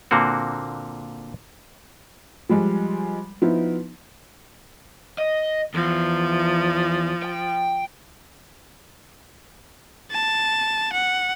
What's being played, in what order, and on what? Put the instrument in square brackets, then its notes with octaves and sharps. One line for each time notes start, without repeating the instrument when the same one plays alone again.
[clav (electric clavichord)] A#2 D3 A#3 C4 F#4
[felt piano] F3 G3 G#3
F3 B3 D#4 E4
[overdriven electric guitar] D#5
[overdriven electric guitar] E2 [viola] F3
[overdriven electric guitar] G5
[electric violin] A5
F#5